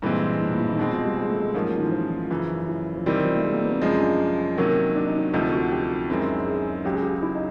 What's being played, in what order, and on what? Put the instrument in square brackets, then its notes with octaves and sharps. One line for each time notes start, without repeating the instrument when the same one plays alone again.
[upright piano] G2 E3 G#3 C4 [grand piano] A#2
[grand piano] A2
A#2
E3
D#3
[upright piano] B2 G#3 C4
[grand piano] F3
G3
G#3
A3
G#3
[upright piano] G#2 F3 A#3 C#4 [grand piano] F#3
[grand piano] D#3
E3
F3
[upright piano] F#2 C#3 E3
[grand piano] E3
F3
[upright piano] C3 D#3 G3 C4 [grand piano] E3
[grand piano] F3
A3
G#3
A#3
B3
C4
[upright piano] F#2 C#3 F3 G#3 [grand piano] C#4
[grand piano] D4
[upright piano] C3 D#3 F#3 A#3 C#4
[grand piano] D4
D#4
D4
[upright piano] D2 C3 F3 [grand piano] D#4
[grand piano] F#4
G4
[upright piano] F#2 D#3 G#3 C4 E4
[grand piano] G#4
[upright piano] C#2 C#3 F#3 [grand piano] G4
[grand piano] G#4
G4
E4
D#4